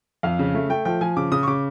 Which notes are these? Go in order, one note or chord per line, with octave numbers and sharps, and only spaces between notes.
F2 F5
C#3
A3
A3 G5
F3 G5
F3 G#5
C#3 D6
C#3 D#6
C#6
C#3 D6